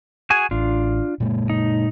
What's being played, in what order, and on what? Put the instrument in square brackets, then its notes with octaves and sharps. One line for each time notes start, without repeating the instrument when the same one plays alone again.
[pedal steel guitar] F#4 G#4 G#5
[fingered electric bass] A1 [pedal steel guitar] D4 F4
[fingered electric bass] A#2 G#3 A#3
[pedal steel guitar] D#4